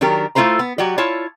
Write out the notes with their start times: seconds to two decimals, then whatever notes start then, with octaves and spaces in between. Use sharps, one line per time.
0.01 D#3 F#3 D4 G4 A#4
0.35 A3 E4 F4 A4 C5 A#5
0.59 B3
0.78 F#3 F#4 G4 D5
0.98 E4 F4 C#5 A5